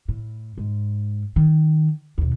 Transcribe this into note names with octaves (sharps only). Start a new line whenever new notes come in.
A2
G#2
D#3
D#2 B2